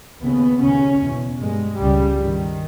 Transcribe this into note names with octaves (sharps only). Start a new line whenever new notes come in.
D#2 C#3 B3
D#2 C#3 C#4
E2 B2
G2 G#3
C#2 C#3 G3
G2 D#3